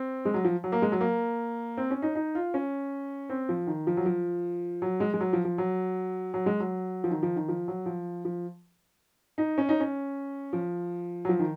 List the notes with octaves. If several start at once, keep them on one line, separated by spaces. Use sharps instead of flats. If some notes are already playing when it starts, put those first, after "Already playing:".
Already playing: C4
G#3
F#3
F3
F#3
A#3
G#3
F#3
A#3
C4
C#4
D#4
D#4
F4
C#4
C4
F3
D#3
F3
F#3
F3
F#3
G#3
G#3
F#3
F3
F3
F#3
F#3
G#3
F#3
F3
D#3
F3
D#3
F3
F#3
F3
F3
D#4
C#4
D#4
C#4
F3
F#3
F3
D#3